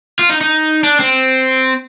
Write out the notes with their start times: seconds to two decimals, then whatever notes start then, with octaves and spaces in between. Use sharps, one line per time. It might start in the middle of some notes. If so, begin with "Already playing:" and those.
0.19 F4
0.30 D#4
0.41 D#4
0.84 D4
1.00 C4